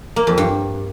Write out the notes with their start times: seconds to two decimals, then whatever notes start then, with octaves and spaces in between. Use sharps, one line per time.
0.16 A#3
0.27 F2
0.38 G2